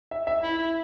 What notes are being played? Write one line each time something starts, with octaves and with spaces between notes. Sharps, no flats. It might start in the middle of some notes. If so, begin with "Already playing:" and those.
E5
E5
E4
E4